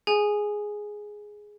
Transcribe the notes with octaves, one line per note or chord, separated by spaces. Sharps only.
G#4 G#5